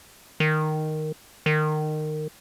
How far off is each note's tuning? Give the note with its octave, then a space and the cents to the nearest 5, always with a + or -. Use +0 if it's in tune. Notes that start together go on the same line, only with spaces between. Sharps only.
D#3 -5
D#3 -20